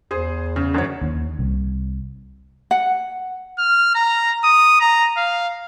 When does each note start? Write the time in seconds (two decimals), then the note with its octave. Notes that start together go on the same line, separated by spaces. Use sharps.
0.11 E2 G#4 C5
0.56 C#3
0.74 F#2 D3 C#5
1.01 D#2
1.39 C2
2.71 F#5
3.59 F6
3.95 A#5
4.44 D#6
4.80 A#5
5.17 F5